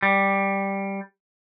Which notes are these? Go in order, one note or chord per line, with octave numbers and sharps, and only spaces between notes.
G3